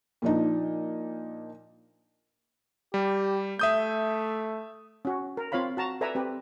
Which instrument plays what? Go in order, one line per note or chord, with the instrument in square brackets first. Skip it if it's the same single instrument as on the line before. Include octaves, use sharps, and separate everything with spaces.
[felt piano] A#2 F3 D4 D#4
[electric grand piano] G3 [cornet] G4
[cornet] A3 [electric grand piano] E5 D#6 G6
[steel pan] C#4 F#4
A#4
C4 F4 C#5 F5 B5
F#4 A5 A#5
A4 B4 D5 E5 G#5 A#5
C4 G4 B4